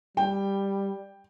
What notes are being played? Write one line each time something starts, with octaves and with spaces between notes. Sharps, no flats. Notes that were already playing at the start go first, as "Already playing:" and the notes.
G3 G5